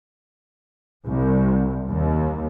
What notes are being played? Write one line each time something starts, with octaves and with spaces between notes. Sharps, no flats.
C2
D#2